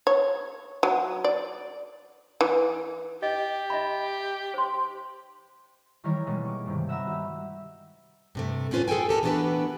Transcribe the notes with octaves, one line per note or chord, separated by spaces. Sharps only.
C#5
F#3
D5
E3
G4 D#5
D#5 E5 B5
C5 C6
D#3 E3 G3 E4 A#4 C#5
B2 G3 G#3 A#3
C#6 D6
G2 C3 D#3
E5 F#5 A#5 B5 E6
F#4 G4
G2 C3 A3
A2 E3 C#4 F4 B4 C5
G#4 A4 C#5 G5 G#5
G4 A4 A#4
E3 A3 B3 D4 G4 B4